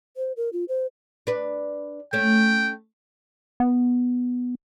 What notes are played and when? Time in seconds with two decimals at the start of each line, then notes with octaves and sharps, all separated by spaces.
0.17 C5
0.37 A#4
0.53 F4
0.69 C5
1.27 D4 B4
2.13 A3 C#4 G5
3.60 B3